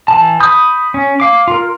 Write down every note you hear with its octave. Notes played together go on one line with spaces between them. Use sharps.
E3 A5
B5 D#6 G6
C#4
F5 D6
F4 A#4